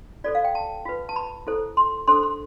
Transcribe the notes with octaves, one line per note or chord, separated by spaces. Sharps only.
F4 A4 C5 D5
F5
G5
A5
F4 B4
A5
B5
E4 A4 C5
C6
D4 A4 C5 C6
C6